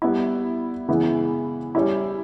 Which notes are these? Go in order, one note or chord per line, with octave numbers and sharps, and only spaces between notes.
G3 B3 E4
C#3 E3 G#3 B3 E4
G3 C#4 E4